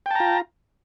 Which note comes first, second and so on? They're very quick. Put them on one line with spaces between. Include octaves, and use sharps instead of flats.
G5 A5 A#5 F4